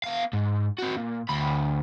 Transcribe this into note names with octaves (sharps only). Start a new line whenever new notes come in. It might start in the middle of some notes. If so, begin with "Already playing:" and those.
B3 F5
G#2
C4 F#4
A#2
D2 B5